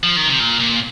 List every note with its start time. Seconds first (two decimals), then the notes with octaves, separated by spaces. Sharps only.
0.03 F3
0.16 D#3
0.28 C3
0.40 A#2
0.60 A#2